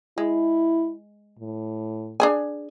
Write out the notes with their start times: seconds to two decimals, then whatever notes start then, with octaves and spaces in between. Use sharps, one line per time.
0.18 G#3 E4
1.39 A2
2.20 D4 G#4 G#5